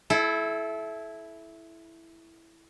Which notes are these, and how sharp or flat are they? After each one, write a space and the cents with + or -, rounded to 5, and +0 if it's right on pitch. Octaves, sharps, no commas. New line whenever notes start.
E4 +0 A4 -30